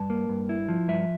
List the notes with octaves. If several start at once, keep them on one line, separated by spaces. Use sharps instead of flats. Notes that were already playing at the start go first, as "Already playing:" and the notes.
Already playing: G2 A5
A#3
G2
E4
F3
G2 E5